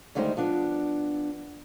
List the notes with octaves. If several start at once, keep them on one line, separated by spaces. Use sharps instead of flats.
D2 D#3 G3 G#3 D#4 C5
F3 B3 D4